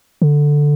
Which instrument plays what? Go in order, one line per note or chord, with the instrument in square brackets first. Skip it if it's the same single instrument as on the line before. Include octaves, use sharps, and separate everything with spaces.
[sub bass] D3